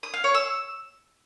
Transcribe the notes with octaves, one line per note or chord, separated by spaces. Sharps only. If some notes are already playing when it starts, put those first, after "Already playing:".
D#6
F5
C#5
E6